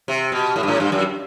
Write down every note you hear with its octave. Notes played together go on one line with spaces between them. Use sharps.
C3
B2
A2
G2
A2
G2
F#2